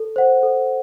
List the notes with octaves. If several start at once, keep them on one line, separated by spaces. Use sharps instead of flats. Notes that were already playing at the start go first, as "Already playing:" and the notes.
Already playing: A4
C5 F#5
A4